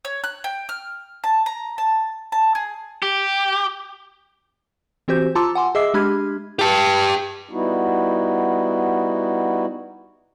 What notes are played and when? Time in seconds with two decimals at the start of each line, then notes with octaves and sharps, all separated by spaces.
0.05 C#5
0.24 F#6
0.44 G5
0.69 F6
1.24 A5
1.46 A#5
1.78 A5
2.32 A5
2.55 G#4
3.02 G4
5.08 E3 C4 F#4 G4 C5 G6
5.35 F4 A5 A#5 C6 D6 E6
5.55 F#5 G#5 C6 D6
5.75 G#4 D#5 E5 D6 E6 C7
5.94 G#3 D4 G4 B5 F6 G#6
6.59 G4 A5
7.49 G3 B3 D#4 E4 F#4